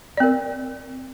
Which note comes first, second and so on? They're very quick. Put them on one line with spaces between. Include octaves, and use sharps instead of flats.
D5 C4 A#4